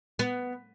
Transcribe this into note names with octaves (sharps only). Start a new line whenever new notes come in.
B3